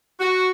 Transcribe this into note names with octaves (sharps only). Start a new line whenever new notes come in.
F#4